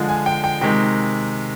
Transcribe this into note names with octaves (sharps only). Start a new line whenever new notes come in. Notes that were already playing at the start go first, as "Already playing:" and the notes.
Already playing: D3 F3 G#3
G#5
G5
G5
C3 D#3 G#3 G5